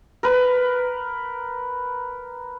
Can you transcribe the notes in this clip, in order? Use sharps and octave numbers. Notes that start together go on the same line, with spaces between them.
A#4 B4